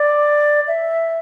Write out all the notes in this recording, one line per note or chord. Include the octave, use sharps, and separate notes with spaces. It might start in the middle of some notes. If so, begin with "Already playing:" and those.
Already playing: D5
E5